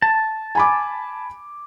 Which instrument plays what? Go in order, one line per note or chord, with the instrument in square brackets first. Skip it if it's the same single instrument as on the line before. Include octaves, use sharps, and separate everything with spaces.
[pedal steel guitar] A5
[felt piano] G#5 B5 D6